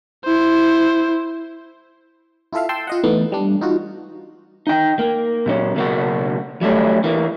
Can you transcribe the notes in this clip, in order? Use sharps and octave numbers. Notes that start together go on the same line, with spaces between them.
E4 C5
E4 F4 A4 E5 F5
G5 A5 C6 E6
F4 D#5 F#5
E3 A3 B3 D#4
G3 D4
D#4 F4 F#4
D#4 G5
A#3
A#2 F#3 C#4
B1 C#3 A#3 F#4
F#3 G3 A3 C#4
E3 A#3